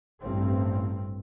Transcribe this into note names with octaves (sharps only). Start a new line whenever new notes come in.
A1 G2 C4